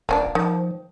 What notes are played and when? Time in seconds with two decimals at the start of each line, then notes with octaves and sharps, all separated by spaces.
0.09 D#1 A#3 C#4 D4
0.35 D#3 F3